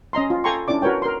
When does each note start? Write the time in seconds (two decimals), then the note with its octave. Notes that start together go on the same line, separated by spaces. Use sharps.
0.13 C#4 D#5 A#5 C6
0.30 F4
0.44 A4 G5 G#5 A#5 C6 C#6
0.68 C#4 D4 E4 D5 D6
0.82 F#4 A#4 B4 C#5 G5
1.02 A#4 C6